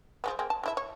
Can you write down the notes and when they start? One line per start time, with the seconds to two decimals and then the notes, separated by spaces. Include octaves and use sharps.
0.24 F3 G#3 B3
0.39 G#3 A#3 C4
0.50 A5
0.64 G#3 E4 E5
0.77 C#5